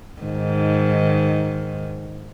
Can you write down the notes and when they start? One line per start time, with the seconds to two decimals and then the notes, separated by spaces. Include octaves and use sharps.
0.22 G#2 D#3